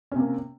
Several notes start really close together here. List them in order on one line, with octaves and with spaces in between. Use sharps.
C#4 C3 A#3